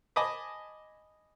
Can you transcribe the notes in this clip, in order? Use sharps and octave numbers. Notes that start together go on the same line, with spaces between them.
D#5 G#5 A5 B5 D6 D#6